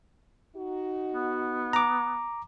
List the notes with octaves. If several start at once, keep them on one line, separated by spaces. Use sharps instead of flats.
D#4 F#4
B3
A#5 D6